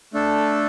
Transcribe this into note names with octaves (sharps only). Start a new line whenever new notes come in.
A3 D4 A4